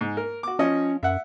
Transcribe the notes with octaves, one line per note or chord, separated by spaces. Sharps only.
G#2
A#4
F#4 D6
F3 C#4 C#5 D#5
F#2 E5 F#5